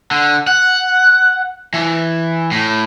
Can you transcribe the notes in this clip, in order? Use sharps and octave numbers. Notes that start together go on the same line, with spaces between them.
D3
F#5
E3
A2